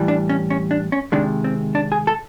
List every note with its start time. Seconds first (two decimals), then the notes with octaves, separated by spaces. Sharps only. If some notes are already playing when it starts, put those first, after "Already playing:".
Already playing: A2 E3 G3
0.08 D4
0.29 C#4
0.50 C#4
0.71 D4
0.92 C#4
1.12 C3 D#3 G#3 D4
1.44 C4
1.75 D4
1.92 G#4
2.07 A4